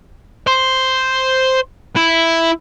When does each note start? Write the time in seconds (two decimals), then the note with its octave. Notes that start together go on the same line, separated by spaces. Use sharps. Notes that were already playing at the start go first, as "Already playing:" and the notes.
0.47 C5
1.96 E4